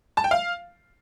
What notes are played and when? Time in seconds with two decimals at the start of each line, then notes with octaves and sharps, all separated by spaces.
0.17 A5
0.24 G5
0.31 F5